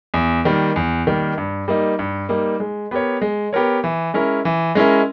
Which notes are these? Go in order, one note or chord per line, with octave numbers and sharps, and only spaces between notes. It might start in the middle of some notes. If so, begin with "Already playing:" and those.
E2
D#3 G3 A#3
E2
D#3 G3 A#3
G2
G3 A#3 D#4
G2
G3 A#3 D#4
G#3
B3 G4 A#4 C#5
G#3
B3 G4 A#4 C#5
E3
G#3 C#4 E4 A#4
E3
G#3 C#4 E4 A#4